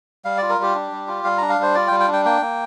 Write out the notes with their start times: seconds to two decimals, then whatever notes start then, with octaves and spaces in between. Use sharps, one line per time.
0.25 G3 F5
0.38 F4 D5
0.49 A#4
0.58 G3 G4
0.75 D4
0.92 G3
1.08 F4
1.24 G3 F5
1.38 D4 A#5
1.49 F5
1.59 G3 C5
1.75 F4 D5
1.88 G3 G5
2.00 G5
2.08 D4
2.13 G5
2.25 A#3 G5
2.42 A#3